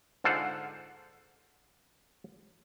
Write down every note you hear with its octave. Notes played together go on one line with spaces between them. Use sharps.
G#2 D3 F4 A4 C5 F#5